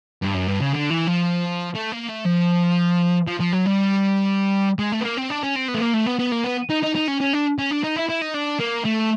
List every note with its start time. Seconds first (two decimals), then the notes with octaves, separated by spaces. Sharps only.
0.23 G2
0.35 F#2
0.48 G2
0.61 C#3
0.73 D3
0.90 E3
1.07 F3
1.75 A3
1.92 A#3
2.09 A3
2.26 F3
3.27 F3
3.40 F3
3.52 F#3
3.65 G3
4.79 G#3
4.92 A3
5.01 B3
5.05 A#3
5.17 C4
5.30 D4
5.43 C#4
5.56 C4
5.68 B3
5.75 A3
5.81 A#3
5.94 A3
6.06 B3
6.19 B3
6.32 A#3
6.44 B3
6.69 D#4
6.82 D#4
6.95 D#4
7.08 C#4
7.20 C#4
7.33 D4
7.59 C#4
7.71 D4
7.84 D#4
7.97 E4
8.09 E4
8.22 D#4
8.35 D4
8.60 A#3
8.85 A3